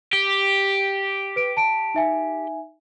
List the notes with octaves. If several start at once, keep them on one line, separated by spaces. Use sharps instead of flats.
G4
B4 D7
A5 D7
D#4 E5 G#5